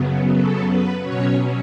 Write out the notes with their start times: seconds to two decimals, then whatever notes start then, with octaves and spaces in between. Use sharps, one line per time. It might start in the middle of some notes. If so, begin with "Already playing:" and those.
Already playing: F#2 C#3 F#3 B3
0.35 A4
0.69 B4
1.02 B2 F#3 C#4 C#5